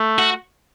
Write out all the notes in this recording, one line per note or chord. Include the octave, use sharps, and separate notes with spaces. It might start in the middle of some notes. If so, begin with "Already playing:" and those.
Already playing: A3
F#4